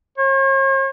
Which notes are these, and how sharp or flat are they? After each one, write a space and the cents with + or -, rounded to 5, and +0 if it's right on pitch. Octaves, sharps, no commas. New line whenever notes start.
C#5 -45